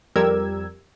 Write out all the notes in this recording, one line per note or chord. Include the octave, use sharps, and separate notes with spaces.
F2 G3 G4 A#4 E6 G#6